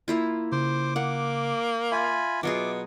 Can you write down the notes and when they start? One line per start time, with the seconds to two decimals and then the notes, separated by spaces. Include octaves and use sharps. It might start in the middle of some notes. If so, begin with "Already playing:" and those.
0.08 A#3 E4 F4
0.52 C#3 C5 D6
0.96 A#3 F#5
1.92 F4 E5 G#5 B5
2.43 B2 F#3 F4 G#4 D6